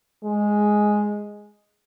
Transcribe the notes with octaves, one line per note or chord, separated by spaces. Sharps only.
G#3